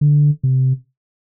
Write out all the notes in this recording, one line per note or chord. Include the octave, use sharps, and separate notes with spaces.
D3
C3